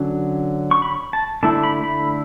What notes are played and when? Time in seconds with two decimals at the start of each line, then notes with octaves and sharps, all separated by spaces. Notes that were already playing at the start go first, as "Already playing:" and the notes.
Already playing: D3 F#3 C#4
0.71 C#6
0.82 B5
1.13 A5
1.43 D3 A3 E4 A5
1.63 B5
1.84 B5